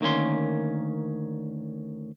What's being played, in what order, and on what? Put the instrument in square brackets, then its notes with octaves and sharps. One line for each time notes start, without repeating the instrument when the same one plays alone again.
[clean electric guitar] D2 D#3 A#3 C#4 C6